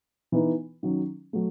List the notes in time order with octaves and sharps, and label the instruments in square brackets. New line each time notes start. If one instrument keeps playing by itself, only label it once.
[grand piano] E3 B3 D#4
D#3 F#3 C#4
F#3 A3